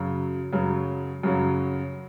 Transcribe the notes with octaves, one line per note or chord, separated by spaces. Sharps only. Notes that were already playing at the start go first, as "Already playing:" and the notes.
Already playing: F#2 C#3 F#3
F#2 C#3 F#3
F#2 C#3 F#3